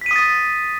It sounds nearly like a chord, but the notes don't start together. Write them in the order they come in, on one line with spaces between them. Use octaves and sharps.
B6 D#7 D#6 A6